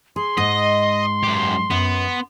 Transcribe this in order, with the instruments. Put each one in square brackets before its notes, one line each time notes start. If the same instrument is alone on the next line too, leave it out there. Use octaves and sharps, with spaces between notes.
[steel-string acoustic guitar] G#4 [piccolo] C6
[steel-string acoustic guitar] G#2 [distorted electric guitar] D#5
[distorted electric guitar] F#2 G4
[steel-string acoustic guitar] F#2 [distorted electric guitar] B3